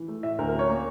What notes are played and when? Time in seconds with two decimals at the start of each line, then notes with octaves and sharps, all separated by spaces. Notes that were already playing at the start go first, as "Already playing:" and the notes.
Already playing: E3
0.08 A3
0.23 A2 E5
0.39 D2 A#4
0.49 C#4 A#4
0.59 C#5
0.69 A#3